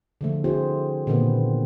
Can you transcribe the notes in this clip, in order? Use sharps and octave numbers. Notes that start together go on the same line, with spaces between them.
D3 F3 A3
C4 E4 F#4 G#4 C5
A#2 D3 D#3 B3 C4 B4